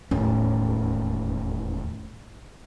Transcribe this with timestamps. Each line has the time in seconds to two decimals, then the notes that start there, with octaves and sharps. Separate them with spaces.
0.11 E1 D#2 A2 C#4